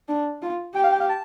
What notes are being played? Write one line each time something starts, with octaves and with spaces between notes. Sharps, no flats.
D4
F4
G4 G5
F5
G5
F5
A5